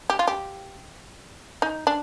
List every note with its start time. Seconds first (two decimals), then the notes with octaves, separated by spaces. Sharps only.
0.10 G4
0.19 F4
0.28 G4
1.62 D#4
1.87 D4